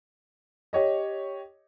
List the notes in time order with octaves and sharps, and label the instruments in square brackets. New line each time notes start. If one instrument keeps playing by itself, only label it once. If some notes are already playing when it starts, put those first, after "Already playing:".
[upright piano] G4 C#5 D#5